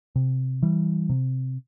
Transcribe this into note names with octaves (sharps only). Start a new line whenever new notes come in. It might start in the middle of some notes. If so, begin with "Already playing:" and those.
C3
E3 G3
C3